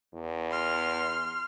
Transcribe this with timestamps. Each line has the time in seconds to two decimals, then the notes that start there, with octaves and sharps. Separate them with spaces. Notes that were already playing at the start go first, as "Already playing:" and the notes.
0.14 E2
0.50 C6 F6